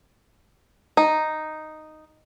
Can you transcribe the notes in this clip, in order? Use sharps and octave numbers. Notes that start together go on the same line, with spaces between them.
D#4